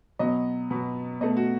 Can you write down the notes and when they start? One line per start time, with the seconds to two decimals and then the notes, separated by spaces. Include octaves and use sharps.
0.19 B2 F#3 B3 D#5
0.70 B2 F#3 B3
1.20 B2 A3 D#5
1.37 F#4